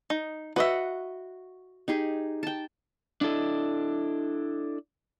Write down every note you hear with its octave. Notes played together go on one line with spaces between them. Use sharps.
D#4
F#4 B4 D#5 E5 F#5
D#4 G4 G#4
G5 A5
D4 E4 A4 D#5